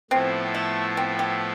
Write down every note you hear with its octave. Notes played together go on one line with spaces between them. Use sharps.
A2 F3 B3 C4 E4 A4
A3
C4
G4